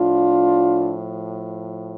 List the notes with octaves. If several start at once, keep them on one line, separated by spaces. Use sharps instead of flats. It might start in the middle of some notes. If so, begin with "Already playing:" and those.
Already playing: A2 F3 D4 F4